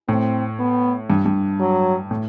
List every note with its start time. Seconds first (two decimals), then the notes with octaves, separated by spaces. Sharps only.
0.09 A2 C4
0.59 B3
1.10 G2
1.26 G2
1.60 F#3
2.11 A2